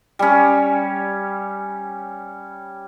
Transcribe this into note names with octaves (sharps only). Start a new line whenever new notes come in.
G3 C#4